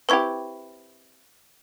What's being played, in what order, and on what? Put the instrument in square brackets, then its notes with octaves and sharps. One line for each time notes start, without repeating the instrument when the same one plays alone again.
[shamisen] C4 E4 G4 [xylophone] B4 C#6 G#6